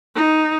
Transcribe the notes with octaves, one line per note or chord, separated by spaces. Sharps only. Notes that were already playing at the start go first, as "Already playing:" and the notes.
D#4